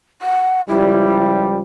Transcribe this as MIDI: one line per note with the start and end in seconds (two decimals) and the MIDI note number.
0.22 0.61 78
0.68 1.60 37
0.68 1.60 53
0.68 1.60 55
0.68 1.45 64